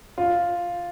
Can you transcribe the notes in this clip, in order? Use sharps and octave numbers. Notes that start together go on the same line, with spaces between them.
F4